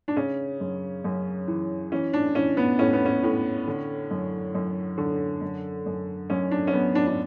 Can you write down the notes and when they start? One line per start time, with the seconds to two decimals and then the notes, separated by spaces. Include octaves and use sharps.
0.08 D4
0.17 C#3 C#4
0.60 F#2
1.04 F#2
1.47 E3
1.92 E3 C#4
2.13 D4
2.35 E3 C#4
2.57 B3
2.79 A2 C#4
2.93 B3
3.06 C#4
3.23 A2
3.67 D3
4.11 F#2
4.55 F#2
4.98 D3
5.41 F#2
5.86 F#2
6.30 F#2 C#4
6.51 D4
6.67 C#4
6.73 F#2 B3
6.95 D4
7.07 D4